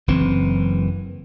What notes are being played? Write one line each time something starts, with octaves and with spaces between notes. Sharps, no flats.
F#1 E3 C4